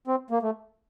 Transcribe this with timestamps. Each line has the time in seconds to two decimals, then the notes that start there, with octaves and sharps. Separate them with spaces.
0.07 C4
0.31 A#3
0.42 A3